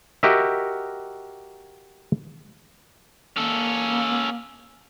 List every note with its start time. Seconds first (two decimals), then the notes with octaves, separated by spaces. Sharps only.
0.23 F#4 G4 A#4 D#5 E5
3.36 A#3 C#4 A4